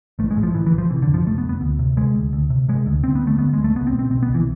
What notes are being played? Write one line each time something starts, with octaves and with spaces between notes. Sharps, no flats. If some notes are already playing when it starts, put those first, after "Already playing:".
A1 A3
G#3
A2
F3
A2 E3
E3
A1
F3
C3 E3
D3
F2
F3
F1 A3
B3
F1
B3
D2
C3
C3 G#3
D2
D2
C3
C3 G#3
D2
D2 C4
B3
D3
A3
D3 B3
D2 G#3
A3
C2 B3
C4
B2
C4
B2 C4
B3
C2
E3